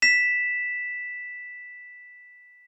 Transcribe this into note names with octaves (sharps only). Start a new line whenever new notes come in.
B6 E7